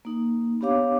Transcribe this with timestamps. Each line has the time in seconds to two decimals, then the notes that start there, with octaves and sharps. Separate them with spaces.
0.05 A#3 D#4
0.61 B3 D4 G4 C#5 F5 D6